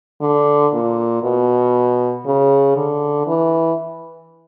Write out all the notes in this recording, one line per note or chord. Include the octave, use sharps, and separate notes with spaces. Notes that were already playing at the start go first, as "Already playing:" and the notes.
D3
A#2
B2
C#3
D3
E3